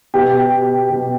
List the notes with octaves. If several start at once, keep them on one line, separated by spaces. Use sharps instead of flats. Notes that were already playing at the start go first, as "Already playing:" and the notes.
B2 G4
B2